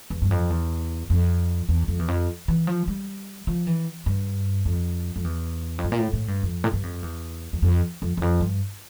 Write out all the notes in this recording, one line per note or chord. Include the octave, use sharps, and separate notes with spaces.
E2
G2
F2
E2
F2
E2
F2
E2
F2
E3
F3
G3
F3
E3
G2
F2
F2
E2
F2
G2
A#2
A2
A2
G2
F2
A2
G2
F2
E2
E2
F2
F2
E2
F2
G2